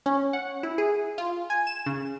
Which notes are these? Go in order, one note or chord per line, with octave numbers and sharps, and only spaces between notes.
C#4
F#5
E4
G#4
F4
G#5
E7
C#3